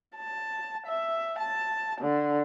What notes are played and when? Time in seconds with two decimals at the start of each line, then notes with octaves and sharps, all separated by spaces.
0.16 A5
0.86 E5
1.39 A5
2.01 D3